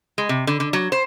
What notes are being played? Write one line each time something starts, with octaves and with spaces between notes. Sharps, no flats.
G#3
C3
D3
D3
F#3
C5